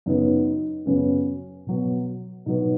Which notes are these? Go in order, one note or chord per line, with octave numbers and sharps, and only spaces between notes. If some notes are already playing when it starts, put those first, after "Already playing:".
F#2 C#3 B3 D#4
F#2 C#3 B3 C#4
B2 F#3 B3
B2 F#3 B3 D#4